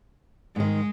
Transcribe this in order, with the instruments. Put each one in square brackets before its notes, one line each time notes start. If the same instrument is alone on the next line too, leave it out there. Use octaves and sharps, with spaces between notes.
[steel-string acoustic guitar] G#2 D#3 [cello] G#3